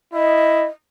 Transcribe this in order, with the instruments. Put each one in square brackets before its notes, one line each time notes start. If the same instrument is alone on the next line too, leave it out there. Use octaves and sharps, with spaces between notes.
[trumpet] E4 [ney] D#5